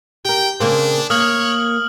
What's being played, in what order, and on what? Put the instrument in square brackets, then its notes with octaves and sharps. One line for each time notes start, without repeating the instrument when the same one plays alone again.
[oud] G4 A#4 [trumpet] G5
[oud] C#3 A#3 C4 [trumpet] D4
[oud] A#3 [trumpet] C#5 [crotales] D#6 F6 F#7